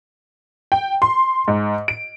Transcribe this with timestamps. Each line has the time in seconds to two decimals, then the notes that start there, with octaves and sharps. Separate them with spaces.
0.72 G5
1.02 C6
1.48 G#2
1.88 D7